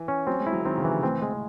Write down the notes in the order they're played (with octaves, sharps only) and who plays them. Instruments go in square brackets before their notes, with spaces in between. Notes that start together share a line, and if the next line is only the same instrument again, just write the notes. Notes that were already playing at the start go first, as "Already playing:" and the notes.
Already playing: [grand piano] E3
[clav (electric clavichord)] C#4
[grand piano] F#3 [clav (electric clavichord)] C4
[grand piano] G#3
[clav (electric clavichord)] E4
[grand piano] F#3
[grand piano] D#3 [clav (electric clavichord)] C4
[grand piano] C#3
[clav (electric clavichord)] E3
[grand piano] C3
[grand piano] A2 [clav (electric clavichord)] C4
[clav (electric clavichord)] G#3